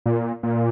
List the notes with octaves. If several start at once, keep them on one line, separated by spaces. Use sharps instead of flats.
A#2
A#2